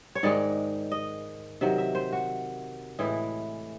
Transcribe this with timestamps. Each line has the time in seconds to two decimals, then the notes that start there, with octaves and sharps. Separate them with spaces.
0.15 C#5
0.23 G#2 D#3 G#3 D5
0.92 D#5
1.61 C3 D#3 F#3 E5
1.78 E5
1.95 C5
2.13 F#4
2.99 A2 E3 G#3 E4